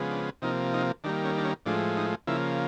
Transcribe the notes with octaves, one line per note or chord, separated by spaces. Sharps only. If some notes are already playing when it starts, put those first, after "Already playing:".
Already playing: C#3 F3 G#3 B3
D4
C3 F3 A#3 D#4
D#4
D#3 G3 A#3 D4
C#4
D4
C#4
A2 F3 G#3 D4
D#4
C#3 F3 A#3 E4